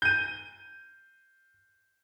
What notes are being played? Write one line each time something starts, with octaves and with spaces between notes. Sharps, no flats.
G6 D#7